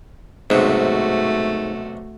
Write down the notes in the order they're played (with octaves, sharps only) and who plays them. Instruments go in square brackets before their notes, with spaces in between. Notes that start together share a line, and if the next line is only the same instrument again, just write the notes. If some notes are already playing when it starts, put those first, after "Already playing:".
[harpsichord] B1 C3 [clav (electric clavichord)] G#2 [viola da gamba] A3 F#4